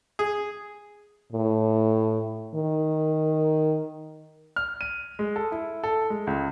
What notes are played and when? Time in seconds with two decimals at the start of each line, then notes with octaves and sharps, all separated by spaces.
0.19 G#4
1.32 A2
2.55 D#3
4.56 F6
4.81 D#7
5.19 G#3
5.36 A4
5.52 E4
5.84 A4
6.10 G#3
6.27 C#2